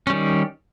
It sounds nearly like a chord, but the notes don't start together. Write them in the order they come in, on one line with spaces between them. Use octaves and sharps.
C#4 G3 D#3